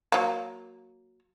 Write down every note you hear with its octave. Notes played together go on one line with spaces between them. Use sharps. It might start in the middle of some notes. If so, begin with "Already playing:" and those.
F#3 A#3